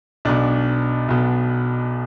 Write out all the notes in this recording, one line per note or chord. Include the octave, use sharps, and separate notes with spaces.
B1 B2 D4
B1 B2